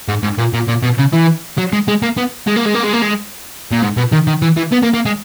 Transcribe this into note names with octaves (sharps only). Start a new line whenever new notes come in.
G#2
G#2
A#2
A#2
A#2
B2
C#3
E3
F#3
G#3
G#3
A#3
B3
G#3
A#3
G#3
A#3
G#3
A#3
G#3
A#2
G#2
B2
D#3
D#3
E3
E3
B3
A#3
A#3
G#3